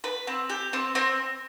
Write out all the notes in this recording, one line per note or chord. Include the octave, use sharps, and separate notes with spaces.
B4
C4
G4
C4
C4